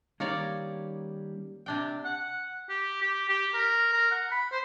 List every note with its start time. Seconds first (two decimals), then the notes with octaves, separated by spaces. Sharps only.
0.20 D#3 G3 A#3 C#4 C#5 D5
1.66 C3 D4 G5
2.05 F#5
2.69 G4
3.02 G4
3.29 G4
3.54 A#4
3.93 A#4
4.11 F#5
4.31 B5
4.52 C5